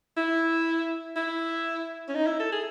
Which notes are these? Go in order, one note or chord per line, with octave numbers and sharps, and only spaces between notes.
E4
E4
C#4
D#4
E4
A4
G#4